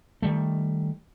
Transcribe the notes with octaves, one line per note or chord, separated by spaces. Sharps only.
D#3 G3 A3